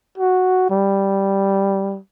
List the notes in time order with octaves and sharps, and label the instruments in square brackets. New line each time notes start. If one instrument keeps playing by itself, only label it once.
[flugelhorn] F#4
G3